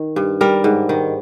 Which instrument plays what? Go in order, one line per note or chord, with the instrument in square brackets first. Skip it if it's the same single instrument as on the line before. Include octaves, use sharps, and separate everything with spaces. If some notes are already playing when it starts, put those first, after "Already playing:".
Already playing: [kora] D#3
G2
G3 A#4
G#2
D#3